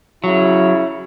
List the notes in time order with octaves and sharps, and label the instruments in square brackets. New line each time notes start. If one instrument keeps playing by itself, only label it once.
[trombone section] C#3 E4 [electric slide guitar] F#3